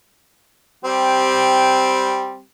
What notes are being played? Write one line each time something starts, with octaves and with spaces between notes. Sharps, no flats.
G3 C4 G4